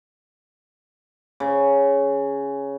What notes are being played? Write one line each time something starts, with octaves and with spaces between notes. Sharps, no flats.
C#3